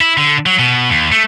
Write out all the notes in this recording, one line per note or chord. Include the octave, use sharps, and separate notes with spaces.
E4
D3
F#3
B2
D#2
A3